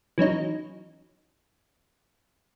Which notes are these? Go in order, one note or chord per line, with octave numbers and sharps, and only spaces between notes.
E3 F#3 C#4 D#4